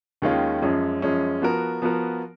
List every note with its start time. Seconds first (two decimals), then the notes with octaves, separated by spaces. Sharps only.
0.22 D#2 D#3 G#3 C#4 F4
0.62 F#2 F3 G#3 C#4
1.02 F#2 F3 G#3 C#4
1.42 F3 B3 F#4 A#4
1.82 F3 B3 F#4 A#4